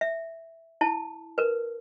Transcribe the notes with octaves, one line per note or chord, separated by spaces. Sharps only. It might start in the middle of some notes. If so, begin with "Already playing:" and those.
E5
E4 A5
A#4 B4